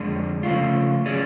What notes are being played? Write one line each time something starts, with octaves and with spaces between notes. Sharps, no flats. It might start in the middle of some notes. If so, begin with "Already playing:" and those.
Already playing: F2 D3 G#3 D4
C#3 F3 A3 F4
F#3 C#4 G#4 D5